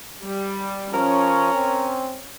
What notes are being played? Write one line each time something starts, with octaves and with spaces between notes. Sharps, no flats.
G3
F3 C#4 A#4
C4